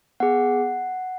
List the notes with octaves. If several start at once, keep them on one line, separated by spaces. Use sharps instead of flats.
B3 G#4 F#5